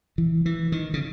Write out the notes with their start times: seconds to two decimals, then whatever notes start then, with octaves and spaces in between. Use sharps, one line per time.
0.18 E3
0.46 E3
0.72 D#3
0.94 C#3